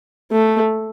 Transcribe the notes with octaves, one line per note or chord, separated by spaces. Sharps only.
A3